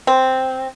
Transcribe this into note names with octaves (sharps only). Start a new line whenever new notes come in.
C4